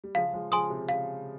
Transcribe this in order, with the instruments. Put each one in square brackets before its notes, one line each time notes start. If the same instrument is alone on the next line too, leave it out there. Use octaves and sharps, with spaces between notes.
[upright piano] G3
[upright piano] C#3 F3 [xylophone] F5
[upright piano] F3 G#3
[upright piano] C#3 F3 [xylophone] G#5 C6 D#6
[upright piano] C3
[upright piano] C#3 [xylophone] F5